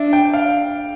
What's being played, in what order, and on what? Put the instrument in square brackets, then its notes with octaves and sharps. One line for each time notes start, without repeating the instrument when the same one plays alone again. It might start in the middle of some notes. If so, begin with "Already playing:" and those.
Already playing: [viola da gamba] D4 [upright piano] E5
[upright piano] G5
F5